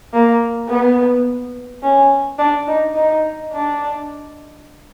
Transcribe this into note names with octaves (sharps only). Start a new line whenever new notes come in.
A#3
B3
C#4
D4
D#4
D#4
D4